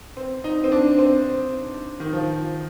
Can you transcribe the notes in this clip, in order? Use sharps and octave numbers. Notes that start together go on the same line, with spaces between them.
C4
D#4
C4
D4
C4
D#3
F3